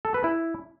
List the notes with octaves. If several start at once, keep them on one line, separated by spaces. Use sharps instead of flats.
A4
B4
E4